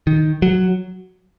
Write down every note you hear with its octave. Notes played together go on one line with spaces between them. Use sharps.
D#3
F#3